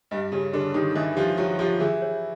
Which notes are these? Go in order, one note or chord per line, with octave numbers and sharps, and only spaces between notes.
G2 G3 D#5
C#3 C#4 G4
D3 D4 G4
D#3 D#4 G4
E3 E4 D#5
F3 F4 G4
F#3 F#4 G4
F3 F4 G4
E3 E4 G#4
C#5